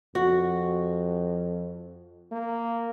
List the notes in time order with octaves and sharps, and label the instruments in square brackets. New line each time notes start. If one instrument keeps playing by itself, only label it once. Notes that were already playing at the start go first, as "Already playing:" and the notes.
[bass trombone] F2 [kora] F#4
[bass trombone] A#3